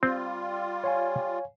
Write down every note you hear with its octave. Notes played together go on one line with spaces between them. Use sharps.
G3 C4 F4
C#5 F5 G#5